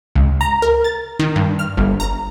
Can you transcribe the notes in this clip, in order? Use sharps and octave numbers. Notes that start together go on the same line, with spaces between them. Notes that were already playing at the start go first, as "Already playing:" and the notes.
C#2
A#5
A#4
A6
D#3
G2
F6
G1
A#5